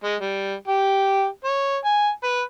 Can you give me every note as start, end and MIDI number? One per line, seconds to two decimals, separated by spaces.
0.04 0.15 56
0.21 0.54 55
0.68 1.25 67
1.45 1.77 73
1.85 2.09 80
2.24 2.41 71